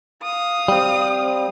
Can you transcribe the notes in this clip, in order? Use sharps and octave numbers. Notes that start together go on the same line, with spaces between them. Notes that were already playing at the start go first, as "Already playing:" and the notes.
F5 D#6
G3 C4